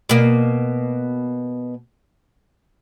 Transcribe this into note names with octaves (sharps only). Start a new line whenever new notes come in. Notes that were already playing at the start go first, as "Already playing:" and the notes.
B2 A#3